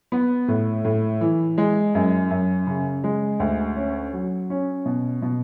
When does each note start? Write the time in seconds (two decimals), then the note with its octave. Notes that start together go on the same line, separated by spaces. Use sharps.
0.12 B3
0.48 A2
0.85 A2
1.21 E3
1.58 G#3
1.95 F#2
2.31 F#2
2.67 C#3
3.04 G#3
3.40 D2
3.76 C#4
4.13 F#3
4.50 C#4
4.85 B2
5.22 B2